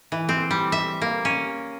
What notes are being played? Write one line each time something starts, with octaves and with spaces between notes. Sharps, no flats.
E3
C4
G3
E5
A#3
C#4